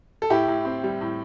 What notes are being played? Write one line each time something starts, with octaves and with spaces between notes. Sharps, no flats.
A4
A2 E4 G4
A2
C4
G3
A2